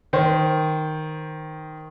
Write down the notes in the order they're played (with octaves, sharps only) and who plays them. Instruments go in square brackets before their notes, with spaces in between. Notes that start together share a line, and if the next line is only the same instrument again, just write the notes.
[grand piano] D#3 C5